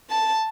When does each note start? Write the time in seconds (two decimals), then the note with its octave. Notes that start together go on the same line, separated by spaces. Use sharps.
0.10 A5